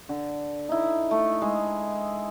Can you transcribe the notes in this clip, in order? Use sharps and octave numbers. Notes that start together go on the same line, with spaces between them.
D3
D#4 E4
A3
G#3